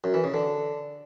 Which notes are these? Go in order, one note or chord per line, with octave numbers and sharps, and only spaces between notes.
F#2
E3
C#3
D3